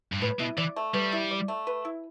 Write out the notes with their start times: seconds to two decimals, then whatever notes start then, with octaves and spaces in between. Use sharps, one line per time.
0.13 G2
0.21 A2 B4
0.40 B2 E4
0.57 E3 D5
0.76 A3
0.94 G3 B4
1.12 E4
1.31 D5
1.48 A3
1.67 B4
1.85 E4